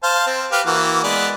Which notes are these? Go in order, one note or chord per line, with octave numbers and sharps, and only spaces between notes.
C5 F5 A5
C4
G4 B4 F5
E3 A#3 F#4
G#3 B3 D5